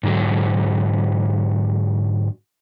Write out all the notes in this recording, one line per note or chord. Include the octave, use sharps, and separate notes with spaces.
G#2 D3 F#3